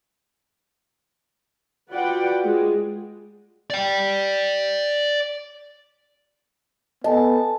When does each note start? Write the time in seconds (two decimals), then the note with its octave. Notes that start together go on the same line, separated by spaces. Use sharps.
1.92 F4 F#4 B4 D5 F#5 G5
2.44 G#3 F4 G#4
3.70 D5 G5
7.04 B3 A4 D#5 G#5 A5